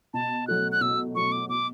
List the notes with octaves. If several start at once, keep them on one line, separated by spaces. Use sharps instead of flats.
B2 A5
F#3 A3 F#6
F#6
B2 E6
F#3 A3 C#6
D6
B2 D6